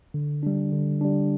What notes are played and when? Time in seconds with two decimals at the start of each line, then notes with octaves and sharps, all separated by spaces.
0.14 D3
0.43 G3 D4
0.72 D3
1.01 G3 D4